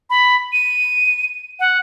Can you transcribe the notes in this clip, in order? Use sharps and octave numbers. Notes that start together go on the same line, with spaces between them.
B5
D#7
F#5